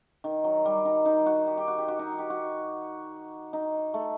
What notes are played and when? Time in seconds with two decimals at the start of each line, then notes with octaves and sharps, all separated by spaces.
0.24 D#3
0.44 F#3
0.65 G3
0.85 D#4
1.05 D#4
1.26 F#4
1.47 G4
1.57 G4
1.68 F#4
1.78 G4
1.88 F#4
1.99 D#4
2.19 G4
2.30 F#4
3.53 D#4
3.94 A3